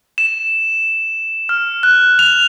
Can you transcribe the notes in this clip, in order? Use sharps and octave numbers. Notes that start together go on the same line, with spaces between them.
E7
F6
F#6
F7